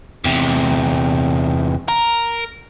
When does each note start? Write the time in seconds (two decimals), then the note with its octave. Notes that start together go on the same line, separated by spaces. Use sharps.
0.24 E2 C3
1.88 A#4